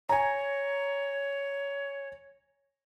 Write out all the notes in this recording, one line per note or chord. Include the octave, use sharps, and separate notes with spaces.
C#5 G#5 A#5